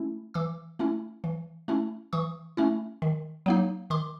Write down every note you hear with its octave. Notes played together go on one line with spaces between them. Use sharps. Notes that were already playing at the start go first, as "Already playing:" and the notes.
Already playing: A3 C#4 E4
E3 D6 E6
A3 C#4 E4
E3
A3 C#4 E4
E3 C#6 D#6
A3 C#4 E4
D#3
F#3 A#3 D#4
D#3 C6 D6